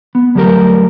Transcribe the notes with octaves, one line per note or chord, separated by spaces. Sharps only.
B3
D3 F#3 G3 A3 G4 A#4